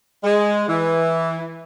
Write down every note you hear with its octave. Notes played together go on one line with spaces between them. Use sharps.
G#3
E3